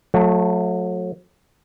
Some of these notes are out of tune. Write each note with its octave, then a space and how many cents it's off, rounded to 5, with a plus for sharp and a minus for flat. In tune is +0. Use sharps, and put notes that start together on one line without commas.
F#3 -35 A3 +0